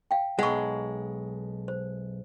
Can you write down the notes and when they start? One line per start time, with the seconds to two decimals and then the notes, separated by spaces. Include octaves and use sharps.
0.11 F5 G5
0.39 B1 G#3 F#5 C#6
1.68 C5